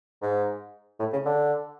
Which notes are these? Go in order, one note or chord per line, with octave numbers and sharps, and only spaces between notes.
G#2
A2
C#3
D3